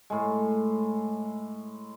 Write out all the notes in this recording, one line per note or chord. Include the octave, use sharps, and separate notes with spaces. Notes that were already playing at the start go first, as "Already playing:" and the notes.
A2 G#3